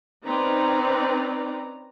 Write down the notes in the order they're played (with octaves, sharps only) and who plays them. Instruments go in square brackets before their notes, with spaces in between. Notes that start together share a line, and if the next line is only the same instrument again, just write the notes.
[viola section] C4 C#4 D#4 B4 D5 A#5